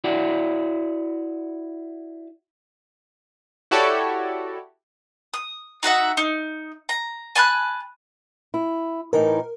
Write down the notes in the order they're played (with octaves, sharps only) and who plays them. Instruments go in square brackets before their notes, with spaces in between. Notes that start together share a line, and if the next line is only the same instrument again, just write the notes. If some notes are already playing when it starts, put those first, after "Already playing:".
[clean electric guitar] E4 F#4 D5
[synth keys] E4 F#4 G4 A4 C#5 D5
[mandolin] D#6
D#4 F#4 E5 F#5
D#4
A#5
G#5 A5 B5 F#6
[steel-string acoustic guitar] E4
[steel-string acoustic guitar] A2 E3 D#4 [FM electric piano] A#4